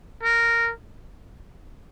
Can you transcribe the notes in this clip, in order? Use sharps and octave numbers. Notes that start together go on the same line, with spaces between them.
A#4